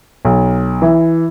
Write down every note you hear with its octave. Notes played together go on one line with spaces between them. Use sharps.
B1
E3